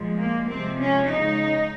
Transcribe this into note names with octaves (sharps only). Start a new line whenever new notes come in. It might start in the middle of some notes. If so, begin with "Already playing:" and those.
Already playing: A#2 F3 G#3
A#3
C3 F3 G#3 C4
C#4
C#3 G#3 D#4